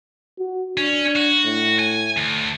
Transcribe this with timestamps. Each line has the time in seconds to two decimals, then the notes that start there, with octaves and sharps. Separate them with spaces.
0.38 F#4
0.77 C#4 D4
1.16 F#4
1.45 A2
1.79 G#5
2.17 D2